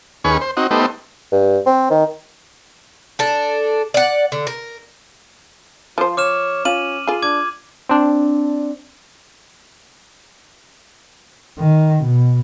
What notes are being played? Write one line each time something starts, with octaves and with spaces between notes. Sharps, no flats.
D#2 C#4 G#4 B4 C#6
C5
C4 D#4 F#4
A3 B3 D#4 G4 C5
G2
C4
D#3
D4 A4
D5 F#5
D3
A#4
F3 F4 C5
C#5 D6 F6 E7
C#4 F4 D#7 F#7
F4 G#4
D4 D6 G#6
C4 D4
D#3
B2